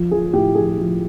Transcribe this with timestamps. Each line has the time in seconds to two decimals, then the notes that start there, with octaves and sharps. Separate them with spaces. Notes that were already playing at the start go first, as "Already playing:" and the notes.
Already playing: F3
0.11 F3 G#4
0.33 A2 G4
0.55 F3 G#4
0.77 F3